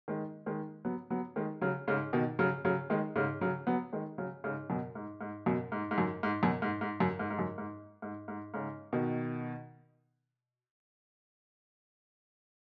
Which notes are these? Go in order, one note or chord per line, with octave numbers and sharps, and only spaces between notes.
D#3 G#3
D#3 G#3
F#3 B3
F#3 B3
D#3 G#3
C#3 F#3
G#2 C#3
B2 D#3
C#3 F#3
C#3 F#3
D#3 G#3
G#2 C#3
C#3 F#3
F#3 B3
D#3 G#3
C#3 F#3
G#2 C#3
F#2 B2
G#2
G#2
F#2 B2
G#2
G#2
F#2
G#2
F#2 B2
G#2
G#2
F#2
G#2
G#2
F#2
G#2
G#2
G#2
G#2 C#3
B2 D#3